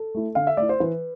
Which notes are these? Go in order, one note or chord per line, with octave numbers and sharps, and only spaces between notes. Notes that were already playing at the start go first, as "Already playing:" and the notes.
Already playing: A4
A3 E4
D3 F5
E5
A3 E4 D5
C5
E3 B4